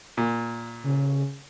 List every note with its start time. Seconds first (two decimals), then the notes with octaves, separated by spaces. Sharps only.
0.17 A#2
0.84 C#3